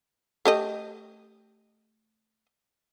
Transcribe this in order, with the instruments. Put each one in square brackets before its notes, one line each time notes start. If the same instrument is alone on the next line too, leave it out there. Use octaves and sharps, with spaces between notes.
[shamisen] A3 G4 D#5